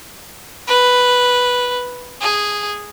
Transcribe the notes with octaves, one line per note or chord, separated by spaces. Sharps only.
B4
G#4